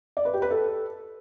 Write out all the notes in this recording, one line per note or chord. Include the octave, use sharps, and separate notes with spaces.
D5
B4
G4
B4
A4